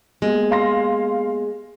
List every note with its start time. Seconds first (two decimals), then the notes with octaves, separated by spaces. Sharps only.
0.22 G#3 A#3 B3 G4
0.51 F5 C6 A#6